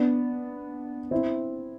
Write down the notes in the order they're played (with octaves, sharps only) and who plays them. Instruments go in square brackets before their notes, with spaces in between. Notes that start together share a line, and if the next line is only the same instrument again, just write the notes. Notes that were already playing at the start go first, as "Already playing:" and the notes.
Already playing: [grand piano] B3 D4
C4 E4